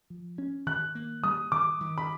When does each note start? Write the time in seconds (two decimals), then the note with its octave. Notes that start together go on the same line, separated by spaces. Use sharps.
0.10 F3
0.38 C#4
0.66 D#3 F#6
0.95 A#3
1.24 G3 D#6
1.52 D#3 D6
1.80 D#3
1.98 B5